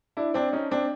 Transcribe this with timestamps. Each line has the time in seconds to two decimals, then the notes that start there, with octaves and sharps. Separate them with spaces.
0.17 D4 E4
0.34 C4 D4
0.53 C#4 D#4
0.71 C4 D4